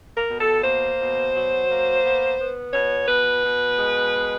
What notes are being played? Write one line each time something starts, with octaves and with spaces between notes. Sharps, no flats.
A#4
B2
A4
A#3 C5
B2
F#3
A#3
B3
B3
B2 C#5
B2 B4
B2
G#3
B2